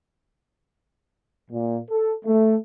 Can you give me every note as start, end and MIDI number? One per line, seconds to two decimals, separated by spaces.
1.51 1.78 46
1.90 2.14 69
2.25 2.55 57